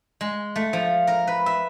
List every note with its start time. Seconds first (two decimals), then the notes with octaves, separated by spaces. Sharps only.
0.21 G#3
0.56 A3
0.73 F3
1.07 A#4
1.27 B4
1.46 E5